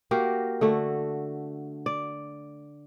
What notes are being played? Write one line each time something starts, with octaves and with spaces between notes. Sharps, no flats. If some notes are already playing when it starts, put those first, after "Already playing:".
A#3 F#4 G4 A#4
D3 A3 F#4
D5